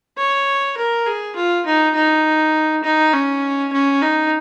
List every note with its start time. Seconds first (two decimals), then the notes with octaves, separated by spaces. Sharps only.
0.18 C#5
0.77 A#4
1.07 G#4
1.36 F4
1.66 D#4
1.95 D#4
2.84 D#4
3.14 C#4
3.73 C#4
4.02 D#4